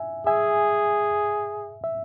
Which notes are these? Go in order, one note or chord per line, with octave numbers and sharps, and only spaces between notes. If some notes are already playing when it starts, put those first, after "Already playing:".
Already playing: E5 G#5
G#4 E5 G#5
E5